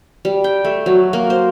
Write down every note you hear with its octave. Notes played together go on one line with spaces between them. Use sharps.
G3
G5
A3
F#3
A#3
C5